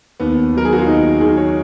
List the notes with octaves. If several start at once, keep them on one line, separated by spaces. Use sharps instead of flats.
D#2 B3
D#3 F#3 A#4
G#4
F#4
F4
D#2 D#4
D#3 F#3 G#4
C#5